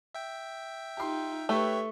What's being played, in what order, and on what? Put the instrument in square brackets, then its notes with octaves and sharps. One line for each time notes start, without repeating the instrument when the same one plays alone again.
[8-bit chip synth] E5 G5
[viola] D#4 F4 [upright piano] G4 C6
[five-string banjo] A3 [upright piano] G4 B4 [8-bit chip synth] C#5 E5 [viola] C#6